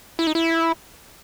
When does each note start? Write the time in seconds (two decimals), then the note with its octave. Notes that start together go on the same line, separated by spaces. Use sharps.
0.19 E4
0.27 D#4
0.35 E4